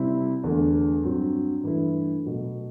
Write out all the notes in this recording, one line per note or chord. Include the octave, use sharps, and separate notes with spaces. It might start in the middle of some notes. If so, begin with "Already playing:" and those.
Already playing: C3 G3 C4 E4
E2 D3 A3
G2 F#3 C4
G2 E3 A3 E4
B2 F#3 A3